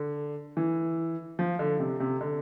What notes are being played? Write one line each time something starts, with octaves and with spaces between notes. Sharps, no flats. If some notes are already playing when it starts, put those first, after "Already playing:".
Already playing: D3
E3
F3
D3
C3
C3
D3